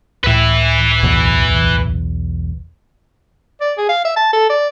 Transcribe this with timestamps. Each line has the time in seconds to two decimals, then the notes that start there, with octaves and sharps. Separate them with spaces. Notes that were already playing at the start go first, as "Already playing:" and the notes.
0.24 C#2 A2 B4 E5
1.03 B1 E2
3.61 D5
3.78 G#4
3.89 F5
4.05 E5
4.16 A5
4.33 A4
4.50 D5